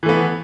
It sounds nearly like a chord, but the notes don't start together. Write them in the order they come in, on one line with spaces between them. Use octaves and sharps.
E3 A3 B3